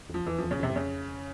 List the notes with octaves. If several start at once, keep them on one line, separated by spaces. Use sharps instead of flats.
E2 F3
E2 E3
E2 F3
C#3
E2 C3
G2
F2 C#3